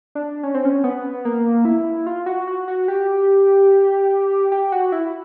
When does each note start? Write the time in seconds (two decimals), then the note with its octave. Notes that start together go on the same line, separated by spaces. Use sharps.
0.15 D4
0.43 C#4
0.54 C4
0.65 C#4
0.84 B3
1.25 A#3
1.65 E4
2.07 F4
2.26 F#4
2.47 F#4
2.68 F#4
2.88 G4
4.52 G4
4.72 F#4
4.92 E4